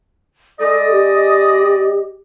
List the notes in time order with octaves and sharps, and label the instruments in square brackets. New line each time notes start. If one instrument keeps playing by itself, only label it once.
[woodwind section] G#3 D5 D#5 [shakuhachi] A4
[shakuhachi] G4